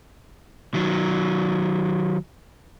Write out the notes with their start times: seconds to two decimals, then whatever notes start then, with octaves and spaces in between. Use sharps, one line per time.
0.74 D#3 F#3